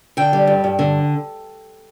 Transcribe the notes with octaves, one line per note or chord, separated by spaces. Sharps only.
D3 G5
G3
G2
G2
D3